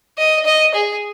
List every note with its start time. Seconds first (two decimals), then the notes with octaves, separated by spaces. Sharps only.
0.18 D#5
0.45 D#5
0.74 G#4